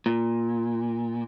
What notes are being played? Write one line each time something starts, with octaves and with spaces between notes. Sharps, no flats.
A#2